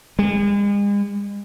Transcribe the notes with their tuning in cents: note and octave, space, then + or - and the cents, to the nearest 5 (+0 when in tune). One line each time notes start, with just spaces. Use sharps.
G#3 -40